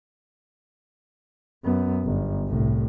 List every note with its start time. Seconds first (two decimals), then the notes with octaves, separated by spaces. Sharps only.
1.65 F#2 B3
2.05 G1
2.48 C2 A2